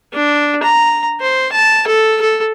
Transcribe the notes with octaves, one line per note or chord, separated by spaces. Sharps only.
D4
A#5
C5
A5
A4
A4